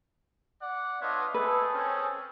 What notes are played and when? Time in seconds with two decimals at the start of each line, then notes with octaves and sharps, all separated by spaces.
0.60 D5 F#5
1.01 B3 D4 F4 C#5 D#5 E5
1.34 G#3 A3 G#4 A4 B4
1.73 C4 C#4